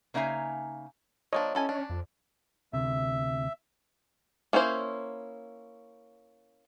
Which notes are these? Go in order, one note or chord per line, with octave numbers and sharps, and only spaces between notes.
C#3 A#3 D#4 E5 G#5 A#5
F3 A#3 D4 C#5 D#5
C#4 E4 A4 G#5
D4
F2
D2 C3 E5
A#3 C#4 E4 C5